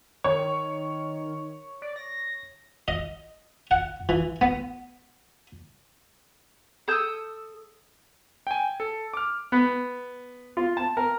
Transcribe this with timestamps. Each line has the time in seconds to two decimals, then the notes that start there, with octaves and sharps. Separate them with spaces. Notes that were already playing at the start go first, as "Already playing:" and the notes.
0.24 D#3 C#5
1.82 D5
1.96 A#6
2.88 D#5
3.71 F#5
4.09 E3
4.41 B3
6.88 A4 D#6 E6 G6
8.47 G5 G#5
8.80 A4
9.14 D6 F6
9.52 B3
10.57 F4
10.77 A5
10.97 A#4